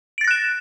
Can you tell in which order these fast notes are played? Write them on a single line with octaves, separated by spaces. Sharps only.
D7 A6 A#6 F#6 E7